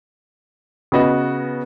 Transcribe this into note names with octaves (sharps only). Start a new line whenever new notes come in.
C#3 B3 F#4 B4 D#5